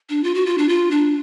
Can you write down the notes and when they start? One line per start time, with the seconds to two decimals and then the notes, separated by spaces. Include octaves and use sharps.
0.09 D4
0.24 F4
0.35 F#4
0.46 F4
0.58 D4
0.69 F4
0.91 D4